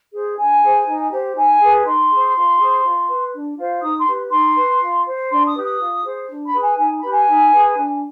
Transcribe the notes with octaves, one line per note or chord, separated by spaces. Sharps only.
G#4 C5
D4 G#5
G#4 C5
D#4
G4 C5
D#4 G#5
G#4 B4
D#4 C6
G#4 C5
F4
G#4 C5
F4
B4
D4
F4 C5
D#4 D#6
C6
G4 B4
D#4 C6
B4
F4
C5
D4 C6
D#6
G4 B4
D#6
F4
G#4 C5
D4
B5
G#4 B4
G#5
D#4 G#5
G4 B4 B5
G#5
D#4
G#4 B4
D4